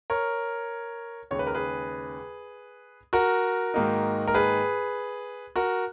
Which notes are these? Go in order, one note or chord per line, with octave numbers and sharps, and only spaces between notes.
A#4 C#5
D#2 C#3 G#3 C#5
B4
A#4
G#4 B4
F#4 A#4
G#2 D#3 A#3 D#4
A#4
G#4 B4
F#4 A#4